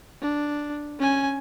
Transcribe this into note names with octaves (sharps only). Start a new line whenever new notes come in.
D4
C#4 G#5